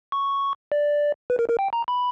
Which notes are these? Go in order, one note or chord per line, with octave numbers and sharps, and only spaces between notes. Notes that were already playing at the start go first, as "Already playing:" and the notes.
C#6
D5
B4
A#4
A#4
G5
A#5
B5